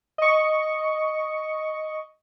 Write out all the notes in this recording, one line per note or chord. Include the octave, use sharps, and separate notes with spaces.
D#5 C#6